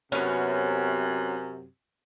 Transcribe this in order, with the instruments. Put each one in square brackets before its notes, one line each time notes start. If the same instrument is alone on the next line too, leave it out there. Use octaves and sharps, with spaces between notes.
[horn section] F#2 C3 [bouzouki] B3 C#4